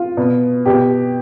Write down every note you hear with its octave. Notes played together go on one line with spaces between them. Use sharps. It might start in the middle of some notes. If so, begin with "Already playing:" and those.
Already playing: F4
B2
B2 G4